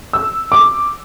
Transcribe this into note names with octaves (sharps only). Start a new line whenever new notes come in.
E6
D6